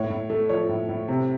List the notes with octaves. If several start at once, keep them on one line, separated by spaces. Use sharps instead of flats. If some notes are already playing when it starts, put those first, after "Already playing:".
Already playing: A2 C#5
A2
A3
F3 C#5
A2
A2
C3